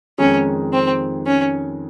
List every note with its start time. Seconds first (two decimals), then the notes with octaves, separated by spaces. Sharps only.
0.18 F2 D#3 G#3 C#4 D#4 G#4
0.72 C4
1.26 C#4